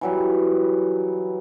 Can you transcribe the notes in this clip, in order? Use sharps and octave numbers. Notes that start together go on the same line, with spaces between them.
E3 F#3 G3